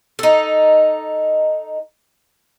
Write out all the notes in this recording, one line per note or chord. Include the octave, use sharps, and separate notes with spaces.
D#4 A4